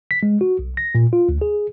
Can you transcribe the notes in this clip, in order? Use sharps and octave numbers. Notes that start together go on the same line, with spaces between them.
B6
G#3
F#4
B1
A#6
A#2
F4
D2
G#4